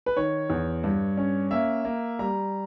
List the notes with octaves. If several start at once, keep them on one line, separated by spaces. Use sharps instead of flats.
B4
D#3 C#5
E2
G2
C#4
A#3 E5
A#3
G3 A#5